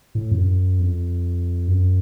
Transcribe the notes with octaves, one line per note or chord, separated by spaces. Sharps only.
A2
F2
F#2
F2
F#2